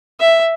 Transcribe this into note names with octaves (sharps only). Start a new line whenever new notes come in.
E5